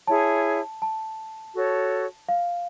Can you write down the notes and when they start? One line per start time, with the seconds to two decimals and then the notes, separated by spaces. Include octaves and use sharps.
0.07 E4 G#4 C#5 A5
0.82 A5
1.55 F#4 A4 C#5
2.29 F5